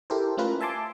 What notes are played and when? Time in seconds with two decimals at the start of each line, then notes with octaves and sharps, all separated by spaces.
0.10 E4 G4 A4 A#4 C5
0.37 A3 C#4 F4 A#4 B4
0.61 E5 G#5 A5 C6 D6